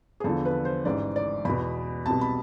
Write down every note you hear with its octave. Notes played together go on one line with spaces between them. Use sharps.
G#4
E2 D3 F3 A4
B4
C5
A1 G#2 E3 D5
D5
E2 B2 B5
C2 B2 A5
B5